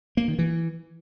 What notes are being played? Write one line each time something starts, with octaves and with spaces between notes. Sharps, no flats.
A#3
D#3
E3